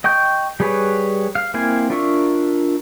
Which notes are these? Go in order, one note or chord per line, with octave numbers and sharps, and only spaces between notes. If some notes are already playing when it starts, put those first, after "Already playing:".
D#5 G5 C#6 G6
G3 G#4 B4 C#5
F5
A#3 C4 E4 F5 G#5
D4 F4 A#4 E5 C#6